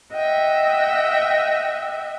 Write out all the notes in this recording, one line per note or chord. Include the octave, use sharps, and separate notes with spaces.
D#5 E5 F#5 G5